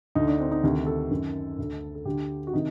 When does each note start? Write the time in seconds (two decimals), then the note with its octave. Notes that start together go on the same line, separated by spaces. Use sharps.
0.15 D2 D3 D#4
0.28 D4
0.40 C4
0.51 D#4
0.63 D2 C3 D#3 G4
0.87 A4
1.11 F#2 D#3
1.58 D2 D3
1.95 A4
2.05 D2 D3 G4
2.47 F#4
2.54 C3 D#3 D#4